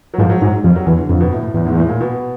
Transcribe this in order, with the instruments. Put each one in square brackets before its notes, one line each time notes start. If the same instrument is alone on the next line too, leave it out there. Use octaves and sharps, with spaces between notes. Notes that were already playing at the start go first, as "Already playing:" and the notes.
[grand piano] F#3
[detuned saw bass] G#2 [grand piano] F3
[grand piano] F#3
[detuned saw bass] G#2 [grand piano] F#3
[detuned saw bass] F2 [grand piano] G3
[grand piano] F#3
[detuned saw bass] E2 [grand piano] E3
[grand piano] D3
[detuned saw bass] F2 [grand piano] D3
[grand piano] B2
A2
A2
[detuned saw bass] E2 [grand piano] A2
[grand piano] G#2
A2
A#2
B2